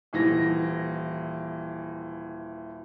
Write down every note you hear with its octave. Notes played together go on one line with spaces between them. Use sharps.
D#1 E3 A#6